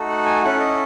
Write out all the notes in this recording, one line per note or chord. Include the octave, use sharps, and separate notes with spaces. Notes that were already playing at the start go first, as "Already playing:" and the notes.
Already playing: A3 D#4 F#4 A4
F#5
G#5
C#4 E4 A4 F#5
D#5